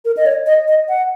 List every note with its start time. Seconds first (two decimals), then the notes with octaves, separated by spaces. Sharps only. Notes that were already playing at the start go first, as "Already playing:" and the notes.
0.05 A#4
0.17 D#5
0.26 C#5
0.46 D#5
0.68 D#5
0.89 F#5